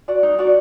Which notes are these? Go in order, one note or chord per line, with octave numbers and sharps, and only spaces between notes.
F#4 D5
D#4
F#4 D5